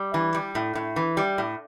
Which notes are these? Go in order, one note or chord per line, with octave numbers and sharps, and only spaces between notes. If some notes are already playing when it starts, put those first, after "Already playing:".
Already playing: G3
E3
G3
A2
A2
E3
G3
A2